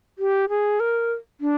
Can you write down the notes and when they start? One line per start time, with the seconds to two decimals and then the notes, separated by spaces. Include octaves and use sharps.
0.18 G4
0.49 G#4
0.80 A#4
1.41 D4